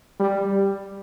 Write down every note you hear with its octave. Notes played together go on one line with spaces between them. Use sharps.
G3